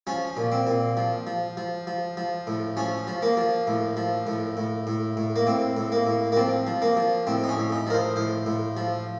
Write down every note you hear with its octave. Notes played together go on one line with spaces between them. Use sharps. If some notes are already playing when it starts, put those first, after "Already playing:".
F3 C#4
A#2
C4
A#2
F3
F3
F3
F3
F3
A2
F3 C#4
F3
A#3
F3
A2
F3
A2
A2
A2
A2
A#3
A2 C4
A2
A#3
A2
A#3
F3 C4
F3
A#3
F3
A2 C4
D#4
C#4
A2
D#4
F3 A#4
C5
A2 C5
A2
F3